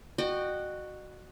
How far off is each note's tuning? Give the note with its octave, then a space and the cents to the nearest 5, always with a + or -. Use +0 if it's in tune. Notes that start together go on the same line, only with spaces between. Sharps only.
F#4 +0 D#5 -40 G5 +0